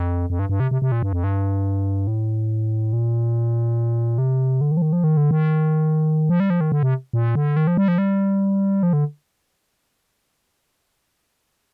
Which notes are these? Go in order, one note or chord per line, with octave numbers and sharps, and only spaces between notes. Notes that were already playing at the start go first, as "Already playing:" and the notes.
Already playing: F2
F2
G2
G2
C3
C3
C3
A#2
G2
F2
G2
A2
A#2
C3
D3
D#3
F3
D#3
F3
D#3
D3
D#3
F3
G3
F3
D#3
D3
C3
A#2
D3
D#3
F3
G3
F3
G3
F3
D3